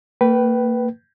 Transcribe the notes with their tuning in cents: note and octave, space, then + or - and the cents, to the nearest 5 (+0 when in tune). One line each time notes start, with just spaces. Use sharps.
A#3 -30 B4 +0 G5 -25